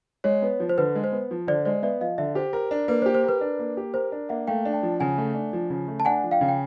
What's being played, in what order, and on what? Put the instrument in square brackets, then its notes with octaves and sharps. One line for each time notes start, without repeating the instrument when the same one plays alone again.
[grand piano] G#3 [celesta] C#5
[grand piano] B3
F3
[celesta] C5
[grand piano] D3 [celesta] B4
[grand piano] G#3
[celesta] C5
[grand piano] B3
F3
[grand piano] D3 [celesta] C5 D5
[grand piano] G#3 [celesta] C5 D5
[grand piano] B3 [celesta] D5 E5
[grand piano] F3 [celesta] D#5 F5
[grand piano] D3 [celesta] D5 E5
[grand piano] G4 [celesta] C5
[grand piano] A#4
D4
[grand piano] A#3 [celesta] B4
[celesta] C5
[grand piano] G4
[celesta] C5
[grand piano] A#4 [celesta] B4
[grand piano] D4
A#3
G4
[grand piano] A#4 [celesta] C5
[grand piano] D4
[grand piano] A#3 [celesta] E5 F#5
[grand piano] A3 [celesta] F5 G5
[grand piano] D4
[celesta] G5 A5
[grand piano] F3
[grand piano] C#3 [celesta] F#5 G#5
[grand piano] A3
D4
F3
C#3
A3
[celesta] A5
[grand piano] D4 [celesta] F#5 G#5
[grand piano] F3
[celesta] F5 G5
[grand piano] C#3
[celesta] G5